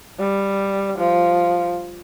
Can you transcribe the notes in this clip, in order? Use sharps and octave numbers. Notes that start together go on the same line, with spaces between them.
G3
F3